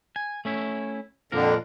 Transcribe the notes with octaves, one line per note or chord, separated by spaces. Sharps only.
G#5
A3 C#4 E4
F2 A#2 D3 F3 A#4